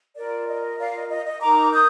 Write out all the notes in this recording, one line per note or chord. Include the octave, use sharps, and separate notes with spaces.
F4 A#4 D5
D#5
D5 F5
D#5
D#5
D#5
D#4 A#4 A#5 D6
D#6 G6